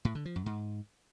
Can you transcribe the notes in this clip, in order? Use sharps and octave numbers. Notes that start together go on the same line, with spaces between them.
A2
D3
F3
F#2
G#2